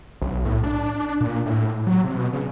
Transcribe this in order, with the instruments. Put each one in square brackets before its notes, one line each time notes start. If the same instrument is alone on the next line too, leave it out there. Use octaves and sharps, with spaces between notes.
[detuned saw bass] B1
A2
D4
A#2
A2
F#3
C3
B2
C#3